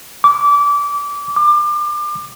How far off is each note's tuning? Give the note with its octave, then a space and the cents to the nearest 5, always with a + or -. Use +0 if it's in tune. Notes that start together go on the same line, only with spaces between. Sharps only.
D6 -25
D6 +30